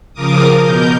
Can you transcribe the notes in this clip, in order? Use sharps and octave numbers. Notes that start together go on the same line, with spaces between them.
C#3 F3 A#4 D6 D#6
B2 A#4 G6